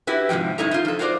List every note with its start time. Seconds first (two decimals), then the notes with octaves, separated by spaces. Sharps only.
0.07 E4 F#4 G4 B4
0.29 G#2 C3 E3 F3 G5
0.58 F#2 A2 D#4 E4 A4 A#5
0.71 D#4 F4
0.85 F3 A4
0.99 F4 F#4 A#4 C5 D5